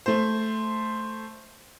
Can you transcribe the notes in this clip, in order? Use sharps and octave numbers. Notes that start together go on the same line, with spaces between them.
A3 C5